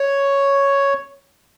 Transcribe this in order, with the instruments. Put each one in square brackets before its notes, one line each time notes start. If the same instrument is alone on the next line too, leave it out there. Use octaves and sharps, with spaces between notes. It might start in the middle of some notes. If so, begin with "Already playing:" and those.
Already playing: [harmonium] C#5